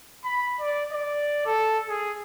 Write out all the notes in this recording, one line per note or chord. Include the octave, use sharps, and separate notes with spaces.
B5
D5
D5
A4
G#4